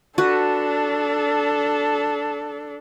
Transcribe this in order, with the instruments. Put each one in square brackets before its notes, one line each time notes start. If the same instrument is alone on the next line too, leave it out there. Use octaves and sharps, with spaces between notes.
[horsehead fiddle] D4 A4 [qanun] F#4 B4